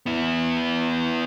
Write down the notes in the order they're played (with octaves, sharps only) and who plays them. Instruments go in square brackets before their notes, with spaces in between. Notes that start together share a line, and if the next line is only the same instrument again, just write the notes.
[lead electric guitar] B3 E4